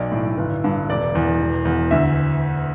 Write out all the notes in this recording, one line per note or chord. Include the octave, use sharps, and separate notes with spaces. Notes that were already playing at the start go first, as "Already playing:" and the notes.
Already playing: B1 D5
A2
G1
G2
E1 D5
E2
E1
E2
D2 E5